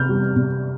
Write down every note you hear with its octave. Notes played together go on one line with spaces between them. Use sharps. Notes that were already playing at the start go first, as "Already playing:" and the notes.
Already playing: C3 F6 G6
G3
C3